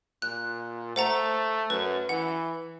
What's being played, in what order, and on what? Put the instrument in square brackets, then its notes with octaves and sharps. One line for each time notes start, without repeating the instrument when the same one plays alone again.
[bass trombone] A#2 [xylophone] F#6
[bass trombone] A3 [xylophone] C5 F#5 A#5
[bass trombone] F#2 [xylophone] B4
[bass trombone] E3 [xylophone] F#5